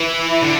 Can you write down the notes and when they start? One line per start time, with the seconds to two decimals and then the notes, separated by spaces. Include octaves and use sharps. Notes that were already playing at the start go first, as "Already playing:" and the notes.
Already playing: E3
0.42 D3